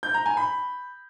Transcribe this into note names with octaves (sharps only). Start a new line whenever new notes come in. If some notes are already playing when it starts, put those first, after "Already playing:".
G6
A#5
G#5
B5